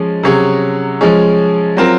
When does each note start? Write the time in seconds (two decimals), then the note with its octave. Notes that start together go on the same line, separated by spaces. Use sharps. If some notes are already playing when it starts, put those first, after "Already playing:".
Already playing: F3 G#3 C#4
0.23 C3 F#3 C#4 G#4 C#5
1.01 F3 G#3 C#4
1.77 F#3 C4 F4 A#4